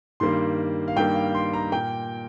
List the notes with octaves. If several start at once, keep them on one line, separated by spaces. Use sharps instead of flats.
G2 D#3 G3 A#3 C6
F5
G2 D#3 G3 A#3 G5
F5
C6
A#5
A#2 A#3 G5